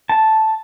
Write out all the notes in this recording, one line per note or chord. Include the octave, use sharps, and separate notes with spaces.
A5